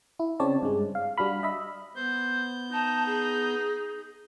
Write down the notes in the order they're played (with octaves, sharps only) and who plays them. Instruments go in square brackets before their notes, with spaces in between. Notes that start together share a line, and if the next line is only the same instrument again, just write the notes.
[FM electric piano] E4
C#3 C4 C#5 D5 A5
G2 G#3
F5
G3 D4 F#4 F5 B5
D#5 E5 B5
[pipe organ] B3 G6 [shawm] C5
[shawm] D#4 [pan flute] A5
[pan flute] G#4